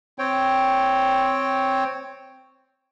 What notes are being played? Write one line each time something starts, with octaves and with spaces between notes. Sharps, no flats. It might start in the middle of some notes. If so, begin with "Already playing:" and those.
C4 C#5 G5